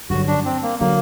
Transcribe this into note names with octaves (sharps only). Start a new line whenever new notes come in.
G2 D3 F#3 F#4
D4
C4
A#3
D3 F#3 A#3